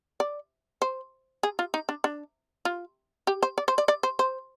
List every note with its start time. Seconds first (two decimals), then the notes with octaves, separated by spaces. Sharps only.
0.20 D5
0.82 C5
1.43 G#4
1.59 F4
1.74 D#4
1.89 D4
2.04 D4
2.65 F4
3.27 G4
3.43 C5
3.58 D5
3.68 C5
3.78 D5
3.88 D5
4.03 C5
4.19 C5